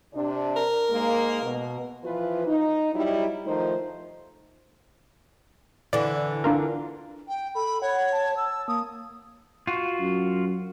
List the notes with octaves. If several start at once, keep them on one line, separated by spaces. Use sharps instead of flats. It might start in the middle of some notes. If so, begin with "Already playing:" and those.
C3 D4
A#4
G#2 G#3 A#3
B2
E3 F3 F4 B4
D#4
F#3 G3 D#4 E4
D#3 F3 A3 D#4 C5
D3 E3 D5
D4 F4 A#4
G5
A4 B5
C#5 F#5
A5
E6
A#3 D#6
F4 F#4
F#2